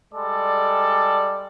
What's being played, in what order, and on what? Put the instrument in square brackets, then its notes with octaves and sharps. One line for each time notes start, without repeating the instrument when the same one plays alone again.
[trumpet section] G3 G#3 A4 D5